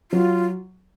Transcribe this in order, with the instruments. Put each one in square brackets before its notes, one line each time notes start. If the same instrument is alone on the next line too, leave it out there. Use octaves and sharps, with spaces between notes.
[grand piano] F#3 [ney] F4